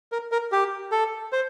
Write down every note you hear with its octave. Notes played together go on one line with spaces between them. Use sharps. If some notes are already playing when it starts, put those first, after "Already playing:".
A#4
A#4
G4
A4
C5